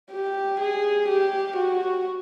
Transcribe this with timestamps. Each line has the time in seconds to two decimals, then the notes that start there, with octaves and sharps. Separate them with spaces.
0.13 G4
0.60 G#4
1.09 G4
1.57 F#4